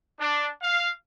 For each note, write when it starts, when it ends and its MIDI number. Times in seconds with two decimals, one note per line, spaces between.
0.19 0.47 62
0.62 0.89 77